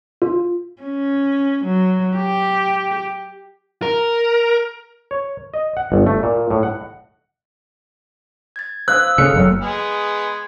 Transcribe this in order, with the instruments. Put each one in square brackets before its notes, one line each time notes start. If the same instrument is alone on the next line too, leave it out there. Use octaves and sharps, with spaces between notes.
[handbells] F4
[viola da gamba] C#4
F#3
G4
[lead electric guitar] A#4
[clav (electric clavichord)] C#5
D#5
F#5
G1
A3
A#2
A2
F#5
[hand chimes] G#6 A6
[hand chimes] C5 F5 D#6 [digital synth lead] E6 [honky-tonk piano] F#6
[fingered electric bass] C#3 [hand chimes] A#3 A4 F6 [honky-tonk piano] C#7
[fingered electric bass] F#1 F#3
[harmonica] G#3 B3 G#4